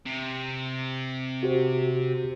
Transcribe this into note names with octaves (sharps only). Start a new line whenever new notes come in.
C3
F#4 G4 C5